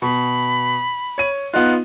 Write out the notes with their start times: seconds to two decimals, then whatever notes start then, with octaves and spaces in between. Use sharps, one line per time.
0.02 B2 B5
1.18 C#5 D#7
1.54 B3 D#4 F4 F#6